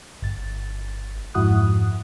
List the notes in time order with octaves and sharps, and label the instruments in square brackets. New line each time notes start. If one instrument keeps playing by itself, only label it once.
[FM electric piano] G1 A6
F2 G#2 E4 F#4 D#6 F#6